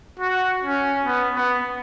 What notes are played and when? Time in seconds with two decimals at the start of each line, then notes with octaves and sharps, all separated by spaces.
0.19 F#4
0.63 C#4
1.06 B3
1.36 B3